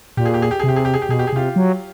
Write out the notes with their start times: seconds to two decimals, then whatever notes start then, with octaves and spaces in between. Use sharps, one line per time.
0.17 A#2 G4
0.26 G#4
0.34 G4
0.42 G#4
0.51 G4
0.60 G#4
0.64 C3 G4
0.76 G#4
0.85 G4
0.94 G#4
1.02 G4
1.09 B2 G#4
1.19 G4
1.27 G#4
1.33 C3 F4 G4
1.56 F#3